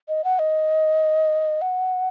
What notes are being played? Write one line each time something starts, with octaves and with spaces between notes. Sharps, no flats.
D#5
F#5
D#5
F#5